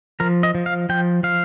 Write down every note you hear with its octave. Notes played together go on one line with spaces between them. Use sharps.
F3 A#4
D#5
F3
F5
F3 G5
F3 F5